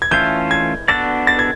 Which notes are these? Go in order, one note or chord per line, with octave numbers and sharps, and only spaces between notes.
G#6
E3 A3 C#4 F4 A4 G6
G#6
B3 D4 F#4 A4 D5 A6
A6
G#6